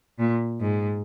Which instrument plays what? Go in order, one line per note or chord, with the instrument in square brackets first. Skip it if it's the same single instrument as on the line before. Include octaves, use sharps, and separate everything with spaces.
[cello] A#2
G#2